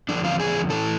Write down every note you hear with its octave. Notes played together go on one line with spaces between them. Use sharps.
E2 D3 F3 D4
F4
G#4
A2 E3 A4